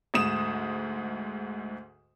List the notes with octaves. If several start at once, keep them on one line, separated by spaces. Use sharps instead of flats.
D2 G#2 D#6 E7